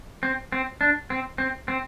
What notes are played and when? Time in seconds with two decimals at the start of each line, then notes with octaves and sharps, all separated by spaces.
0.23 C4
0.52 C4
0.81 D4
1.10 C4
1.38 C4
1.68 C4